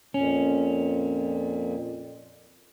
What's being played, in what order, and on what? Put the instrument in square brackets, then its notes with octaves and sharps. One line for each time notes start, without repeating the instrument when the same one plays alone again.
[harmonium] F2 A#2 [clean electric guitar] C#4